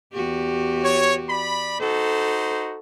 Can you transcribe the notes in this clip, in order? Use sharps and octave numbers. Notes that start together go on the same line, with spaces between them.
E2 F#4 G4
C#5
D5 B5
D#4 F#4 A4 C5